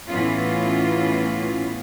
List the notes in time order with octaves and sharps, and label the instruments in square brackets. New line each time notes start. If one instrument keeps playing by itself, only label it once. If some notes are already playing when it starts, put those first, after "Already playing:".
[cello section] A2 E3 B3 C#4 F4